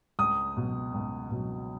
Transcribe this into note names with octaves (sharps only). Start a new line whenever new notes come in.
C#2 D#6
B2 F#3
C#2
B2 F#3